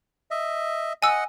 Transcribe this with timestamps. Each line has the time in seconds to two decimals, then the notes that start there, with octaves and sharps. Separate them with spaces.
0.31 D#5 E5
1.02 D#5 F#5 G#5 E6